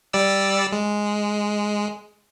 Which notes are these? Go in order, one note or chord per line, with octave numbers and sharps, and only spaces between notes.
G3 D5 E6
G#3